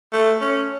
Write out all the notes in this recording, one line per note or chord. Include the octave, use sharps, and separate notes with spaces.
A3
C#4